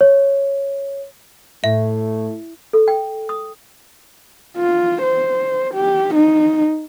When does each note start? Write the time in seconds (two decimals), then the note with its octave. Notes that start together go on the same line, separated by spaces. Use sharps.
0.01 C#5
1.64 A2 A3 E5
2.73 A4
2.88 G5
3.29 D#6
4.57 F4
5.02 C5
5.74 G4
6.15 D#4